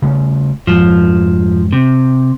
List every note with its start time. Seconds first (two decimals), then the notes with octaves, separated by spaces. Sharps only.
0.02 C#3 A3 C#4
0.67 F2 G#2 F3
1.73 C3